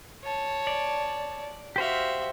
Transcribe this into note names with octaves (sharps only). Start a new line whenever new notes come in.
C#5 A5
D5
F#4 G4 C5 E5 F5